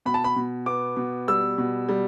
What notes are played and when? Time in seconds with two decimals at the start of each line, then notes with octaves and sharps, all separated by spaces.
0.06 B2 B5
0.14 A5
0.24 B5
0.36 B2
0.66 B3 D6
0.97 B2
1.28 G3 E6
1.58 B2
1.89 G3